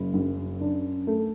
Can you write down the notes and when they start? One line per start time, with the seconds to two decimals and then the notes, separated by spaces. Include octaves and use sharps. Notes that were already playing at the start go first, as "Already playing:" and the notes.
Already playing: F#1
0.14 F#2
0.61 D4
1.07 A3